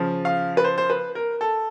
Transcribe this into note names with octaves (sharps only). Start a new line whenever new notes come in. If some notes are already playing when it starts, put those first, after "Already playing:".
Already playing: C#3 F3
F5
B4
C5
C5
B4
A#4
A4